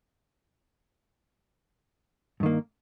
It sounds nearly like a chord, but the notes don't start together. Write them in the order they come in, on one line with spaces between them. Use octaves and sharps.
G2 D#3 A#3